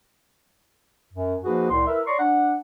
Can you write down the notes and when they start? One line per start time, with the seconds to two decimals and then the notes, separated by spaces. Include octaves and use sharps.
1.12 F#2
1.44 F3 A#3 D#4 F#4 G#4 B4
1.70 C2 A2 C6
1.87 E4 A#4 B4 E5
2.06 C#5 D5 A#5 C6 C#6
2.19 D4 F#5